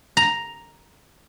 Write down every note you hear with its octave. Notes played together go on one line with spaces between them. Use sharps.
A#5